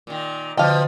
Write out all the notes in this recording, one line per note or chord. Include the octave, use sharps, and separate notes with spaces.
A#2 D#3
B2 D3 F3 D#5 F5 G5 A5